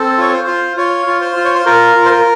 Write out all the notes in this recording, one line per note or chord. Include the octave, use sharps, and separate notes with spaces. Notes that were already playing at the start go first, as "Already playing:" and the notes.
Already playing: C4 A4
F4 C#5
C5
F4
F4 C#5
F4
C5
F4
C#5
C5
F4 A#4
F4
C5
A#4